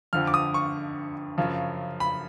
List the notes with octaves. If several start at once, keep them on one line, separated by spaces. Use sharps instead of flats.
F2 D3 F3 F6
D6
D#6
C#6
F#2 C#3 F3
B5